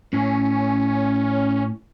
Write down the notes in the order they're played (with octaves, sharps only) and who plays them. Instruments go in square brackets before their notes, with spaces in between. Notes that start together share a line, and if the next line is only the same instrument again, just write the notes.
[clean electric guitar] A2 [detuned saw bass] C#4